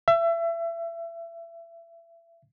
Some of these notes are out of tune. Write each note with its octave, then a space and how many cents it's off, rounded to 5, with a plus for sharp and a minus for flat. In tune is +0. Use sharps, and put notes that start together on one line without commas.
E5 +30